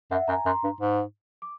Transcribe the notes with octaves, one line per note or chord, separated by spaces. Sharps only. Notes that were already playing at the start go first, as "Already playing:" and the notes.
F#2 E5 F#5
F#2 G#5 A#5
F#2 A#5 C6
G2
G#2
D6